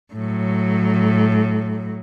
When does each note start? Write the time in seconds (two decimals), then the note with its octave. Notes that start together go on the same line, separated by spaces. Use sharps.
0.14 A2 F#3